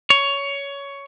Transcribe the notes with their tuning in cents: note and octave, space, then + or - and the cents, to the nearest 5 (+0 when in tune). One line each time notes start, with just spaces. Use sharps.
C#5 +15